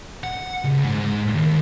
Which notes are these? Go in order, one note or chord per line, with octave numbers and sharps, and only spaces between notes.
F#5
C#2
G#2
D#2